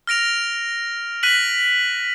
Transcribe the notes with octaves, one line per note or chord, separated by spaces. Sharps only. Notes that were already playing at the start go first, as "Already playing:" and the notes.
F6 A#6 D7 F7
F#6 B6 D#7 F#7